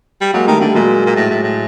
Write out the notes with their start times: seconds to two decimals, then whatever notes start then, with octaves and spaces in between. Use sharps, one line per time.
0.21 G3
0.34 F#3 G#3 A#3
0.47 D#3 G3 A3
0.61 D3 G3 A3
0.74 A#2 F#3 G#3
1.06 A#2
1.16 A2
1.30 A2
1.43 A2